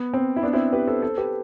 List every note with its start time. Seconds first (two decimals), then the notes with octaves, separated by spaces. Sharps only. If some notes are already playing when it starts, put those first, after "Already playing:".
Already playing: B3
0.14 C4
0.36 E4
0.43 B3 D4
0.53 C4 E4
0.73 G4 B4
0.87 A4 C5
1.02 A4 C5
1.17 G4 B4